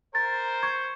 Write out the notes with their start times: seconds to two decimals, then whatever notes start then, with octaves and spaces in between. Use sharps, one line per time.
0.15 A#4 C5 A6
0.63 C#6 G6 G#6